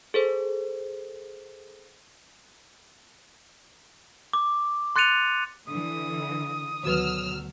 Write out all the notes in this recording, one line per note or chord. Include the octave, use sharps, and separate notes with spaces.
G#4 A4 C5
D6
C6 F#6 A6 C#7 D#7 F7
D3 E3 D#6
D2 B2 D#3 F#3 F#4 B4 E6 F6